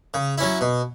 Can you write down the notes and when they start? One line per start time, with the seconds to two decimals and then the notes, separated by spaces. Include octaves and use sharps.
0.14 C#3
0.38 F#3 C#4 E4
0.61 B2